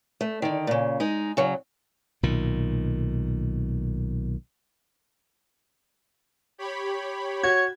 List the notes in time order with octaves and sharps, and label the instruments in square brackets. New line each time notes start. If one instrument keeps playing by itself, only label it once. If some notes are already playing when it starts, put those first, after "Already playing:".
[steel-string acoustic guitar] A3
D3 D#3
A#2 C#3
G#3 D#4
C#3 F#3
[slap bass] B1 A#2 D#3
[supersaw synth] G4 C#5 B5
[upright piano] F#4 [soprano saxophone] C#5 [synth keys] G#6